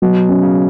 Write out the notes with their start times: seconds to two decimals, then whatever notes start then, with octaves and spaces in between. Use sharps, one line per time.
0.02 B2 F#3
0.29 C#4
0.43 C#3